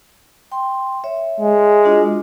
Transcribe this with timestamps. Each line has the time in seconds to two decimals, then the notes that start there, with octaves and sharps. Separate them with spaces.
0.52 G5 C6
1.04 C#5 E5
1.40 G#3
1.84 D4 F4 F#4